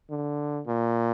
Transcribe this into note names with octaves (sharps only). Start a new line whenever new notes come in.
D3
A#2